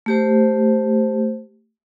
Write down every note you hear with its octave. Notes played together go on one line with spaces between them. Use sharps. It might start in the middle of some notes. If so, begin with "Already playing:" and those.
A3 G4 C5